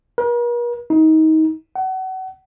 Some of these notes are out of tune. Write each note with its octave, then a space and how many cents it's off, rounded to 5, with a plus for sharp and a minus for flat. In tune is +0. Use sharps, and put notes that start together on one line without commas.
A#4 +45
D#4 +25
F#5 +30